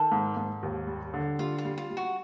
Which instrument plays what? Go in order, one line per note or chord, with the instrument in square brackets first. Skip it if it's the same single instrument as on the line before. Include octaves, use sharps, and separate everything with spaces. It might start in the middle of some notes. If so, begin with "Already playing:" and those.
Already playing: [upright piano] D#3 [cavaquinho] A4
[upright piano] G#2
G#2
D#2
G3
D3
[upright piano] G3 [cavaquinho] F4
[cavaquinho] F4
[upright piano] G3
[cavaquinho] F4
[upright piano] G3
[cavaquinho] F#4